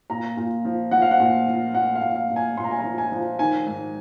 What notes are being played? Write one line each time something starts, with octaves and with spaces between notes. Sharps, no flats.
A#2 A#5
A#2
F3
F3 F#5
F5
F#5
A#2
F3
A#2 F#5
F5
A#2
F5
A#2
G#5
A#2 C6
A#5
G#5
A#5
F3
G#5
F3
D#3 G#5
G#2